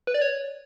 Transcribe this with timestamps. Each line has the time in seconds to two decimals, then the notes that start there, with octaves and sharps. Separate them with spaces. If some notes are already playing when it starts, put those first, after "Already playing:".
0.07 B4
0.14 D5
0.22 C#5